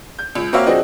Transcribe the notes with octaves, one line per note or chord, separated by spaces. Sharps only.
G6
C#2
A#3 C4 F#4 C#5 E5 F5
F3 C4 D4 F#4 G#4 D#5